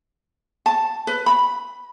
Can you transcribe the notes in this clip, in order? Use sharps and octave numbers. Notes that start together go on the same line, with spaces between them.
A5
B4
B5